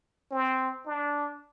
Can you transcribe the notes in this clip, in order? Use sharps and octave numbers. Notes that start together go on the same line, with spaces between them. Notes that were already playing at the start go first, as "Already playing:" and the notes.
C4
D4